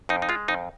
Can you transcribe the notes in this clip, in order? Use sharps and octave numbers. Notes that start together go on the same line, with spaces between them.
F2 D#4
D#4
G#3 F4
F2 D#4